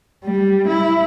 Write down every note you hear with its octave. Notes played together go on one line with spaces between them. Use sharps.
G3
E4